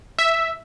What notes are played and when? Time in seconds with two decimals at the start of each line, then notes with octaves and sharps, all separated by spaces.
0.18 E5